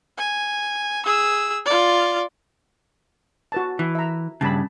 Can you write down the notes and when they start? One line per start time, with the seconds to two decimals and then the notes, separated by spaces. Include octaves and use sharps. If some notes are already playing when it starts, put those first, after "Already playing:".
0.18 G#5
1.06 G#4 E6
1.66 F4 D5
3.52 F#4 B4 A5
3.79 E3
3.95 E5 A#5
4.41 G2 C#3 A5 B5